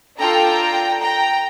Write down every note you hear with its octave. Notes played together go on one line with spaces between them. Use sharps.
D4 F4 A4 G5 A#5
G5 A#5